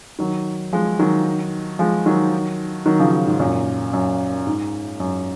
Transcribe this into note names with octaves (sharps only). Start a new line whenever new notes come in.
D#3 F#3
F3 G#3
D#3 F#3
F3 G#3
D#3 F#3
D#3 F#3
C#3 F3
G#2
F#2 A#2
F#2
G#2
F#2